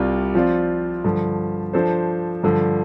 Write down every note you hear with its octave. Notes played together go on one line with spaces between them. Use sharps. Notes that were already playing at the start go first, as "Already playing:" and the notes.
Already playing: C2 C3 G3 F4 D5
F3 C4 F4 D5
G2 D3 F3
F3 D4 A4 C5
G2 D3 F3